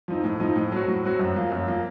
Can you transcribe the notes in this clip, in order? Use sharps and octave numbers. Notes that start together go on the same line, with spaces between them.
F3 C4 D#4
A2
F3 C4 D#4
A2
F#3 C4 F#4
A2
F#3 C4 F#4
F#2
F3 A#3
F#2
F3 A#3